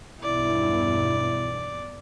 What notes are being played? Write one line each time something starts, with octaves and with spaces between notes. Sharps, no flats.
B1 E2 G2 E4 D5